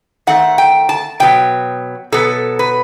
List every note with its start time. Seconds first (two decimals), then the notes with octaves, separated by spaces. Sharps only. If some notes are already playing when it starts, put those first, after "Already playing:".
0.27 D#3 A3 C4 F#5
0.58 G5
0.89 A5
1.20 B2 F#3 B3 G5
2.12 B2 F#3 B3 A4
2.59 B4